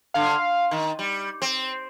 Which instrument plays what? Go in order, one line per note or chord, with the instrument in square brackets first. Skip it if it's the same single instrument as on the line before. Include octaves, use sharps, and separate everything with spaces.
[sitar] D3 [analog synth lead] F5
[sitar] D#3
G3
C4